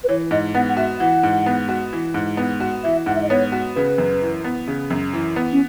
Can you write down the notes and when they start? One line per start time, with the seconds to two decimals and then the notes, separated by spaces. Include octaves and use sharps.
0.04 B4
0.09 E3 C#5
0.31 G#2 D#5
0.55 B3 F#5
0.69 F#5
0.77 F#4 E5
1.00 E3 F#5
1.23 G#2
1.46 B3
1.69 F#4
1.93 E3
2.14 G#2
2.37 B3
2.60 F#4
2.84 E3 E5
3.06 G#2 F#5
3.15 E5
3.22 D#5
3.29 B3 C#5
3.52 F#4
3.75 C#3 B4
3.98 F#2
4.22 E3
4.44 B3
4.68 C#3
4.90 F#2
5.13 E3
5.36 B3
5.52 C#4